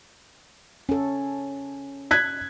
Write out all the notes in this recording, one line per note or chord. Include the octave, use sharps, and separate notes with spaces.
C#4 A4
F#6 G#6 B6